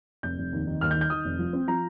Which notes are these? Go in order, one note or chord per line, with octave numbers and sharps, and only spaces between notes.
F1 G6
F1
D#2
D#3
D#2 F6
G6
D#3
G6
D#3 D#6
F1
F3
C4
F3 A#5